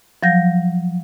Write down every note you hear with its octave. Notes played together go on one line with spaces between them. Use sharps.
F3 F#3 F5 G6 A#6